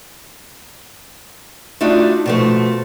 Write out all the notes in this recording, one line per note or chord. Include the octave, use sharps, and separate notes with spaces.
A3 D4 D#4 F4 F#4
B2 F3 A3